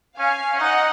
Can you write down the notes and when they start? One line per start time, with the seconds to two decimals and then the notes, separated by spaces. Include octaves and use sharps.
0.18 C#4 F5 G#5
0.54 C#4
0.60 D#4 D#5 F#5